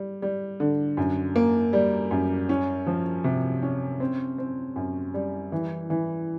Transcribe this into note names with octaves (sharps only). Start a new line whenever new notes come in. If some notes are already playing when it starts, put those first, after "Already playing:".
Already playing: G3
G3
D3
F#2
A#3
G3
F#2
C#4
F3
C3
C#4
C4
C4
F#2
G3
E3
E3